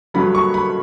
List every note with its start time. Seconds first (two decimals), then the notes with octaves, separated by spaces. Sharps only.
0.14 G2 D3 F#3 B5
0.35 C#6
0.54 B5